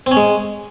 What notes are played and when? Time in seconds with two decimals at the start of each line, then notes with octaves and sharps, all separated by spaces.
0.06 C4
0.11 C#4
0.17 G#3